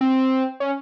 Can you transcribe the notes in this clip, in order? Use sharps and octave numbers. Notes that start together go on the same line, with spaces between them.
C4
C#4